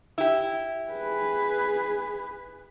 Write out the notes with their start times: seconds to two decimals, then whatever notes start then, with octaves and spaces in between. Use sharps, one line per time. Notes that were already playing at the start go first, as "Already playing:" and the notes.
0.18 E4 G4
0.91 G#4 B4